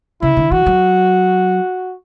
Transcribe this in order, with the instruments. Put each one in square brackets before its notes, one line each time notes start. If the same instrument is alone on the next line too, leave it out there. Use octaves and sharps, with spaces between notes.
[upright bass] C#3 [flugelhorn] E4
[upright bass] D3
[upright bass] E3 [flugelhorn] F#4
[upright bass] F#3